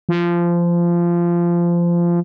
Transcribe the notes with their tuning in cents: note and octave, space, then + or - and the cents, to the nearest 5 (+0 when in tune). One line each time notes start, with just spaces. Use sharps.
F3 -20